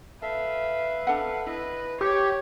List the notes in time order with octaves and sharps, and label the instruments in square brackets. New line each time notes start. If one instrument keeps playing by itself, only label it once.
[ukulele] A4 [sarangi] B4 [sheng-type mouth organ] E5 F5
[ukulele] D4 A4 F#5
[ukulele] E4 [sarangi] B4 [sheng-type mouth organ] D#5
[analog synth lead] G4 [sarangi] C#5 [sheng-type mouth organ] C#6